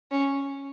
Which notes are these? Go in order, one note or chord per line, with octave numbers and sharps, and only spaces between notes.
C#4